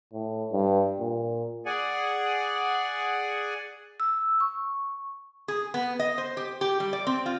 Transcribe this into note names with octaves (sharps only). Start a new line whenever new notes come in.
A2
G2
A#2
G#4 D5 F#5 G#5
E6
C#6
G#4
B3
D#5
C5
G4
G4
G3
D5
C4
F4